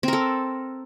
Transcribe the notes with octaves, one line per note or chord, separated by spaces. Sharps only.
C4 A4 A#4